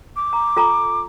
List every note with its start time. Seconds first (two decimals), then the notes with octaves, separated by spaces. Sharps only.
0.16 D6
0.33 A#5
0.57 F4 A4 A#5